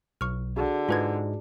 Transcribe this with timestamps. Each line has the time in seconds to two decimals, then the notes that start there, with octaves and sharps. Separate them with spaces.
0.21 B1 C#6 F6
0.56 D3 F#4 G#4
0.89 G#2 G#3 F4 B4 G#6